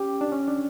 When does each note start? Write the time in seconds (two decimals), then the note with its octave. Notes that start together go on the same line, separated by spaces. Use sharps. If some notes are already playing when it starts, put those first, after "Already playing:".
Already playing: C#4 G4
0.21 D4
0.32 C#4
0.48 D4